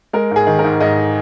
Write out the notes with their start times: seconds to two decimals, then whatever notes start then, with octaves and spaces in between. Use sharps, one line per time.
0.13 G#3 A#4
0.31 G#2 G#4
0.47 D#3
0.59 A#4
0.64 G#2
0.80 G#2 D#5